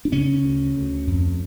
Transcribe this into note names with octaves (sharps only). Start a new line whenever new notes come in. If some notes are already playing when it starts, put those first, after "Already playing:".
D4
C#3 C#4
D2
D2
F2